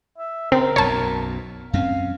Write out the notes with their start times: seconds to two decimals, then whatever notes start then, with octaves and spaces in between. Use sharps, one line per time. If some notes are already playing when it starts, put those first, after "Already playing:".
0.18 E5
0.52 C#3 C4 A#4
0.76 B1 F#2 B2 C#5 A5
1.73 F#2 C4 C#4 F5